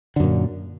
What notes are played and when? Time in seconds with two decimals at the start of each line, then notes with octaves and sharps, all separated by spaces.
0.16 D3
0.20 F#2
0.23 A#2